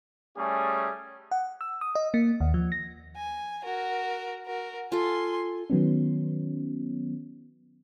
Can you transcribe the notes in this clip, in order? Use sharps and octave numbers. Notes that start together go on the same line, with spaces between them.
G3 A3 C#4 G#4
F#5
E6
D#6
D#5
A#3
D#2
F3
A#6
G#5
F#4 A#4
F#4 A#4
F4 A4 G#5 C6
D#3 F#3 B3 C#4